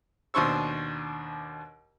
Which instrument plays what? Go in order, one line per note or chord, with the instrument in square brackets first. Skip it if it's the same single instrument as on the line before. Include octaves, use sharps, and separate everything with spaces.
[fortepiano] D#2 B2 D4 C5 C#6 E6